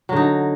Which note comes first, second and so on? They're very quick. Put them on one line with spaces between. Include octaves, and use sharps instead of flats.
F#3 D3 D#4